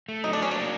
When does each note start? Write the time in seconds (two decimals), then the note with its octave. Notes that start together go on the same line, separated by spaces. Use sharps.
0.09 A3
0.24 F#3 D#4
0.33 D4
0.40 F#3 C#4
0.51 A#3 D4